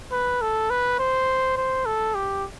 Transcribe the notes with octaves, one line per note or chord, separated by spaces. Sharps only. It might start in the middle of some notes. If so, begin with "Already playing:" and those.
B4
A4
B4
C5
C5
A4
G4